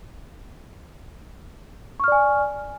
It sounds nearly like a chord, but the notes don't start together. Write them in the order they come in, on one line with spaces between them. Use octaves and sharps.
C#6 F6 D5 G#5